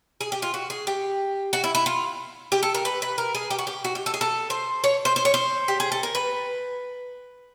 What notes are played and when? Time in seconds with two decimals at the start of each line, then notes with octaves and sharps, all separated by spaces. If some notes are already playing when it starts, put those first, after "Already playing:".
0.21 G#4
0.32 G4
0.42 F4
0.54 F#4
0.70 G#4
0.87 G4
1.53 F#4
1.64 E4
1.75 E4
1.86 F4
2.52 G4
2.63 A4
2.74 A#4
2.85 B4
3.02 B4
3.18 A#4
3.35 G#4
3.50 G4
3.59 F#4
3.67 G4
3.84 F#4
3.95 G4
4.06 A4
4.14 G#4
4.21 A4
4.50 C5
4.84 C#5
5.05 C5
5.16 C5
5.25 C#5
5.34 C5
5.68 G4
5.80 G#4
5.92 A4
6.03 A#4
6.15 B4